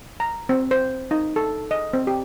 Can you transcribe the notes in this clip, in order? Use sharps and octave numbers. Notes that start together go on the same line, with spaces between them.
A#5
C4
C5
D#4
A4
D#5
C4
G4